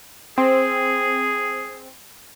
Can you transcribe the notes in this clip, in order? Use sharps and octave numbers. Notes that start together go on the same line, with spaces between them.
C4 G#4